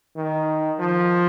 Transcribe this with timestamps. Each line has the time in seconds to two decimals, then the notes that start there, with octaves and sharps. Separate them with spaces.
0.17 D#3
0.79 F3